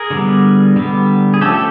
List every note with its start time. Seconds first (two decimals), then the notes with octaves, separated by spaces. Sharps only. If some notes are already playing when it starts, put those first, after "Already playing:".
Already playing: G#4 A#4
0.10 D3 G3 B3
0.76 D3 G3 B3
1.34 G#4
1.41 F3 A3 C#4 G4 A4
1.54 A4